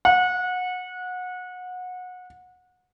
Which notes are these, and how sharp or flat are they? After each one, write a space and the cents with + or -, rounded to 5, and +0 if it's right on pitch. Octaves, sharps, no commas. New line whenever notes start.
F#5 -25